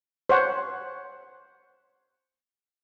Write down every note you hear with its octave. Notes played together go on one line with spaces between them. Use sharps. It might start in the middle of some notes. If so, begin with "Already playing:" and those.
C5 C#5 F#5